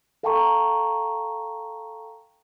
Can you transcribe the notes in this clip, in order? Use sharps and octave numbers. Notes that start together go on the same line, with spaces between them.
A4 F5 G5 A5 A#5 C#6